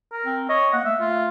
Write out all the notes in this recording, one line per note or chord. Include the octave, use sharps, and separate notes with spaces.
A#4
C4
C#5 D#5
A#3 F#5
A3 E5
F4